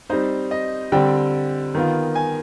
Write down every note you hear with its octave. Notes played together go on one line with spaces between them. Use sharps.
G3 C4 D#4 C5
D#5
D3 G3 C4 G5
D#3 B3 F4
G#5